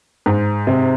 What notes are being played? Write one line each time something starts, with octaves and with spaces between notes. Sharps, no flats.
G#2
C3